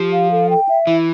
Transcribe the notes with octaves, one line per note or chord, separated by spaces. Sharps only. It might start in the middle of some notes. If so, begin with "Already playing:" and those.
Already playing: F3 G4
F5
A4
G5
E5
E3 E4